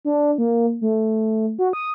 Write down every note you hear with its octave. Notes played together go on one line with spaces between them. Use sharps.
D4
A#3
A3
F#4
D#6